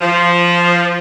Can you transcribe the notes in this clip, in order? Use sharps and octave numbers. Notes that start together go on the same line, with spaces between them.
F3